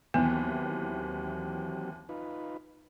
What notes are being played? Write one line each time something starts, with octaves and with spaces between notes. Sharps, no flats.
D#2 E3 F#3 B3 C4 G4
D#4 F4 B4